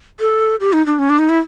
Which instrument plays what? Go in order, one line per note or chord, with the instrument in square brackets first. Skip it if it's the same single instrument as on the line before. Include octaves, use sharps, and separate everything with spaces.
[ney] A4
G4
D#4
D4
C#4
D4
D#4
E4